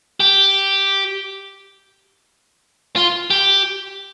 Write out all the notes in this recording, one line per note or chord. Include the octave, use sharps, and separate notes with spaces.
G4
F4
G4